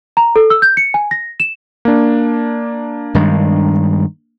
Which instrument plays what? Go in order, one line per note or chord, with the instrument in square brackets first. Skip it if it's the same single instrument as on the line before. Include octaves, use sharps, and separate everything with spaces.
[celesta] A#5
A4
E6
G6
C#7
G#5
A#6
E7
[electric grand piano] A#3 D4
[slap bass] G2 D#3 G#3